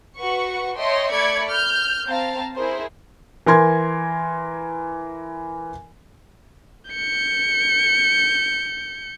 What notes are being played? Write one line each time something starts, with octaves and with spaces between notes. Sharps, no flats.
F#4 B4 F#5 C#6
C#5 D#5 E5 G5 A5 C6
A3 D5 B5 G#6 C#7
F6 G6
C4 F5 A5 A#5
E4 G#4 A#4 C5
E3 A#4 C6 G#6
G6 C#7